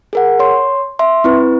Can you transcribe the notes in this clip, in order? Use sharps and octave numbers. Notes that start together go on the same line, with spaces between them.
G#4 A#4 F#5
C#5 C6
E5 C6
C4 E4 B4